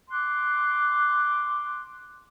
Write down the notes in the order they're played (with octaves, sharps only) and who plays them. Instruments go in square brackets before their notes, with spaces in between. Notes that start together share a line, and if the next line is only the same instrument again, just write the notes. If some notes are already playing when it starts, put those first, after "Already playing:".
[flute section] C6 D6 F#6